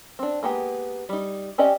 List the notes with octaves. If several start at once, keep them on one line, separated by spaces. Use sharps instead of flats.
C4 D4
G#3 A#3 B3 G4
G3 D#4
C4 C#4 G4 D5 D#5